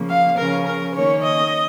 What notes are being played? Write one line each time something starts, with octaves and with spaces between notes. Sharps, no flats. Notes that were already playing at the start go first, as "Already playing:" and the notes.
Already playing: C#3 F3 A#3
F5
C#3 F3 C#4 A#4
A#4
D#3 A#3 C#4 C#5
D#5